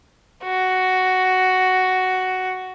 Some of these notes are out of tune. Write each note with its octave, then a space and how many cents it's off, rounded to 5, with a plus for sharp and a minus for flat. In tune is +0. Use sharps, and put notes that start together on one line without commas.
F#4 +5